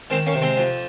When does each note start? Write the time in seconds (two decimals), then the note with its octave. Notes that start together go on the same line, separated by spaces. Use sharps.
0.10 D#3 G#3 C4
0.26 A#3 C#4
0.34 C3
0.42 G#3 C4
0.57 F2